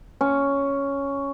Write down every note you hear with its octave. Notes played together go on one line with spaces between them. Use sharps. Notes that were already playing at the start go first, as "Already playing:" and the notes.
C#4